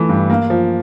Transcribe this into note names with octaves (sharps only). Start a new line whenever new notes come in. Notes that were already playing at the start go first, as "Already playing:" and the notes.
Already playing: E3 A3
G2
A#3
F3